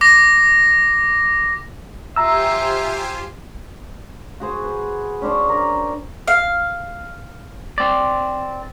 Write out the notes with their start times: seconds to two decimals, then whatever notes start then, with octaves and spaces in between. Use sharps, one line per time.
0.01 D6 A#6
2.16 F4 G4 C5 E5 G#5 A#5 E6
4.40 F#4 G#4 C5
4.64 B4
5.22 C#4 D4 C5 D5
5.49 A#4
6.27 F5
7.78 C4 D5